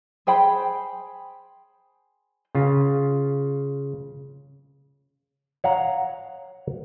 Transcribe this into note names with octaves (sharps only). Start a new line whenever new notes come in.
G#4 C5 G5 B5
C#3 F4
C#5 F5 F#5 A#5